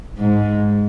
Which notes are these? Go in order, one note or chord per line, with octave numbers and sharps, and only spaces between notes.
G#2